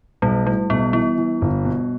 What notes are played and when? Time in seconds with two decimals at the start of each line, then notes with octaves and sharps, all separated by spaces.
0.22 B1 G3
0.46 A2 G3
0.70 B1 B3
0.93 E3 B3
1.18 E3
1.42 G1
1.65 B2